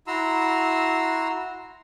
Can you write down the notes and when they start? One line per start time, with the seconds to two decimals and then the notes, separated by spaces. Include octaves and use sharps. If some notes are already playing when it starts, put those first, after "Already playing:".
0.07 E4 F#4 A#5 C6 E6